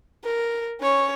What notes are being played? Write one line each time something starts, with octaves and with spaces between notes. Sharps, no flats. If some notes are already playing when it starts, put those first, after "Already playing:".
A#4
C#4 C#5